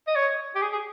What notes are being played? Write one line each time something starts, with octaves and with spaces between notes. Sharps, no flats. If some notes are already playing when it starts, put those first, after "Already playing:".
D#5
C#5
G4
G#4
G#4